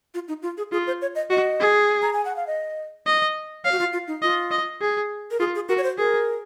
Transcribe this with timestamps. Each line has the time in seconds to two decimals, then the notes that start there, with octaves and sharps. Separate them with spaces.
0.14 F4
0.28 D#4
0.42 F4
0.57 G#4
0.72 F4 G#4
0.87 C5
1.02 C#5
1.15 D#5
1.30 F#4 D#5
1.60 G#4
2.02 A#5
2.13 G#5
2.25 F#5
2.36 F5
2.47 D#5
3.06 D#5
3.65 C#5 F5
3.71 F#4
3.79 F4
3.93 F4
4.07 D#4
4.22 F4 D#5
4.51 D#5
4.81 G#4
5.31 A#4
5.39 F4 G#4
5.55 G#4
5.69 F#4 A#4
5.78 C#5
5.83 C5
5.98 G#4 A#4